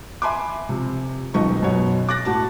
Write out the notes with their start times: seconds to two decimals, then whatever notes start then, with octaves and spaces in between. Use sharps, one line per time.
0.22 E5 G#5 B5 C6 D6
0.69 C3 F3
1.34 D#1 B1 F3 D#4 D#5 C#6
1.62 F#2 B2 G#3 C#5
2.09 D6 F#6 A6 A#6
2.25 A2 F#4 A5